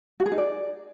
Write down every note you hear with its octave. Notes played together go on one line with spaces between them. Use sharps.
F#4
G#4
D#4
D5